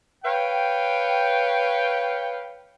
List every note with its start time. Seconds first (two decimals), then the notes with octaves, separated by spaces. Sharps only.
0.24 B4 C#5 F5 G5